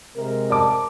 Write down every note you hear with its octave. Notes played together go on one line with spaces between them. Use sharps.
C3 G#3 A#4
D5 A5 D6